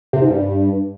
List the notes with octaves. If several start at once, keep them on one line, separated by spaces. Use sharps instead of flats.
C3
G#2
G2